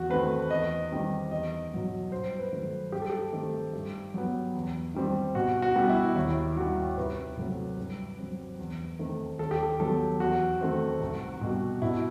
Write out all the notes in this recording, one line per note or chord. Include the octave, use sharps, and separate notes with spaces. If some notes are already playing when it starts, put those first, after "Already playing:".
Already playing: E2 F#4
D#3 A3 C4 B4
E2 D#5
D#3 G3 C4
E2 D#5
B2 F#3 B3
G2 C5
B4
D#3 F#3 A3
G2 G4
A4
G4
D#3 A3 C4
G2
F#3 B3
E2
D#3 G3 C4
B2 F#4
F#4
G3 B3
E4
D#2 E4
D#3 G3 F#4
C2 B4
C3 F#3 A3 C4
G2
F#3 C4
E2
D#3 A3 C4
D#2 A4
G4
A4
D#3 F#3 B3 A4
E2 F#4
D#3 A3 C4
C2
B2 G3
B2 E4